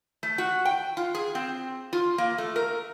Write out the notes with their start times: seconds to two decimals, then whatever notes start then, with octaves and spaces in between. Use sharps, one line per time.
0.23 A3
0.38 F#4
0.65 G5
0.97 F4
1.15 G#4
1.35 C4
1.93 F4
2.18 A#3
2.38 A3
2.56 A#4